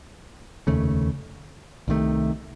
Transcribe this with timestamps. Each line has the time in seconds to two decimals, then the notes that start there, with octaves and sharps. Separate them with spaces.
0.67 F1 D#2 C#3 A3
1.88 C2 C3 D#3 A3